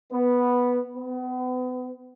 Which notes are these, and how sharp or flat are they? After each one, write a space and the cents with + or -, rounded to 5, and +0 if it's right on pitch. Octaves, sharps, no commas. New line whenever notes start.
B3 -5
B3 +35